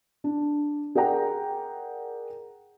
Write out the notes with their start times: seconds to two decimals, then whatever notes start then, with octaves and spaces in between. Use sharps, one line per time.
0.24 D4
0.95 G#4 A#4 D5 F#5 G5 A#5